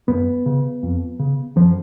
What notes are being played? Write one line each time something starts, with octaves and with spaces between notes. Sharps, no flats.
F#2 B3
C#3
F2
C#3
F#2 F3